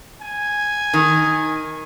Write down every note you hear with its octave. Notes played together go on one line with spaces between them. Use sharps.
G#5
D#3